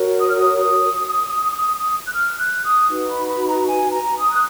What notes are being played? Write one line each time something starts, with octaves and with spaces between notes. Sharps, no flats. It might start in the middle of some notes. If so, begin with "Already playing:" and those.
Already playing: F#4 A#4 C#5
D#6
F6
D#6
D#6
F#6
F6
F#6
D#6
D#4 F#4 B4
B5
B5
A#5
G#5
A#5
D#6
F#6